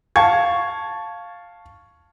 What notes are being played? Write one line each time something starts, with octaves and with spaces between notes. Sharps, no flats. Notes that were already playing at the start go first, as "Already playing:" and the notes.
F5 A5 C#6 G#6